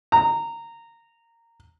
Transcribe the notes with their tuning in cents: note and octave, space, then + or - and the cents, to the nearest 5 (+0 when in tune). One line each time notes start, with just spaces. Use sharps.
A#5 -15